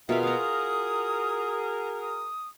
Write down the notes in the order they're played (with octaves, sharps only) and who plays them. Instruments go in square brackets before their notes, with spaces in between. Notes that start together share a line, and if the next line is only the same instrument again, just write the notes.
[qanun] B2 F4 F5 [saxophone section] F#4 G#4 A#4 [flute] E5
[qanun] F5 A#5 [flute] D#6
[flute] D#6